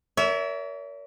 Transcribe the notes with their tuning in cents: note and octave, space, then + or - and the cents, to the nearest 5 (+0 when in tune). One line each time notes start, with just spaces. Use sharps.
A#4 +0 C#5 +45 E5 -5